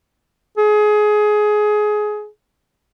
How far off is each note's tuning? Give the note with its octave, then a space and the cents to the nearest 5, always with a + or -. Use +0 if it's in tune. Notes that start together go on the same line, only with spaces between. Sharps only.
G#4 +20